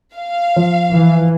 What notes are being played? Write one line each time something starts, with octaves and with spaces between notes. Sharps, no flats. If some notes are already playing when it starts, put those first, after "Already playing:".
F5
F3
E3